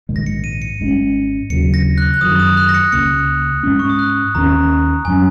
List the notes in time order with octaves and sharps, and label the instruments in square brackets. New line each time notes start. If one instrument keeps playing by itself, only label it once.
[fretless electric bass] A#1 G#2 D#3 G#3
[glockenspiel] A#6
C#7
D#7
C#7
[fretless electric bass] G#1 G#2 G#3 C#4
[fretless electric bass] D#2 C#3 F#3 [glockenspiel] C#7
[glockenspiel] A#6
F#6
F#6
[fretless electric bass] F#2 D#3 F#3 [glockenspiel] D#6
[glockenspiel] D#6
F#6
A#6
C#7
[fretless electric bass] C#2 C#3 A#3 [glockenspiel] C#7
[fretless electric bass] G#2 G#3 C#4
[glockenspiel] C#6
D#6
F#6
[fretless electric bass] D#2 D#3 G#3 C#4 [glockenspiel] A#5
[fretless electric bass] F#2 F#3 C#4 [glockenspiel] G#5